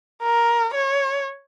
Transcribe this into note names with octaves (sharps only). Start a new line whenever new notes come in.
A#4
C#5